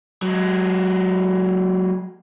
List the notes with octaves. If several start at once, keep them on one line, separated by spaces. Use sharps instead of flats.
F#3 G#3